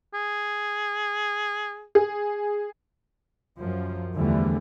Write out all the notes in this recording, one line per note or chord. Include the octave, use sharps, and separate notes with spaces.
G#4
G#4
F#2 F3
E2 D3 E3 F3 G3 A3